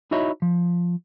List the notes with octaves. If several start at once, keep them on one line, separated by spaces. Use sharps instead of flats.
D#4 E4 F#4 C#5 D#5 E5
F3